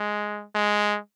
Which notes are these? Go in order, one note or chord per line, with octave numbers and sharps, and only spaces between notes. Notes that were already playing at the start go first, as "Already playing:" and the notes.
Already playing: G#3
G#3